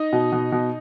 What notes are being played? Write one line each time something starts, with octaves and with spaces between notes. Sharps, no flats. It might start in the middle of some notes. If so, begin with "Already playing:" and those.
Already playing: D#4 D#5
B2
B2
B2